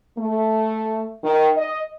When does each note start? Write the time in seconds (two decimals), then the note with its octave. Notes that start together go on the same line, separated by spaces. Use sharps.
0.17 A3
1.23 D#3
1.57 D#5